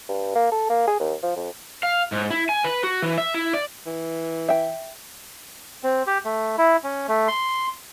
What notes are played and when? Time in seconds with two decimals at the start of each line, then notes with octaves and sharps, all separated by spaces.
0.09 G2
0.35 A#3
0.52 A4
0.70 A#3
0.87 G#4
1.00 D#2
1.23 F3
1.36 F2
1.83 F5
2.12 G#2
2.30 E4
2.49 G#5
2.64 B4
2.84 F#4
3.02 E3
3.18 E5
3.34 E4
3.53 D5
3.87 E3
4.48 E5 G5
5.83 C4
6.07 G4
6.25 A3
6.58 E4
6.84 C#4
7.08 A3
7.28 C6